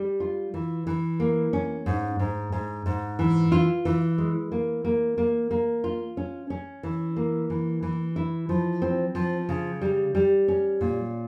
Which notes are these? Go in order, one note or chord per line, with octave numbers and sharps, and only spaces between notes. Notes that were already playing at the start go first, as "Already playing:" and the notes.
Already playing: G3
F4
E3
E3
A#3
C#4
G#2
G#2
G#2
G#2
E3
F4
E3
G#3
A#3
A#3
A#3
A#3
F4
C#4
C#4
E3
A#3
E3
E3
E4
F3
C4
F3
C#3
G3
G3
C#4
A#2